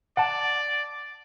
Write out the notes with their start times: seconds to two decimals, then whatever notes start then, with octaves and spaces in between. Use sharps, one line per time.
0.17 D5 F#5 A5